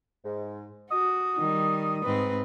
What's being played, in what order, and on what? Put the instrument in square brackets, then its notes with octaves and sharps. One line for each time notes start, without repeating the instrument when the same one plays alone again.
[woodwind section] G#2
[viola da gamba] F#4 [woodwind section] D#6
[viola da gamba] D#3 G3
G#2 C4 B4